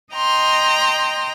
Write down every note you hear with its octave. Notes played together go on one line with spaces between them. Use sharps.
D#5 G5 A#5 C6